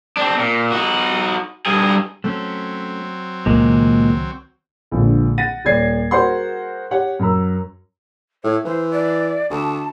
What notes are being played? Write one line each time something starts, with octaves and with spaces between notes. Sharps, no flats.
C4 D4
A#2
D#4 F#4
G2 G#4
F#3 A3 C4 C#4
C#2 A#2 D#3 G#3 A#3
A#1 D3 F3 G#3
F#5 A6 A#6 D#7
D#1 C#5 D5 G#6 C7
F#4 G#4 A#4 C5 F#5 C6
G4 C#5 F#5
F#2 A#4 A#5 E6
A2 C#5
E3 C5
D5
D2 A5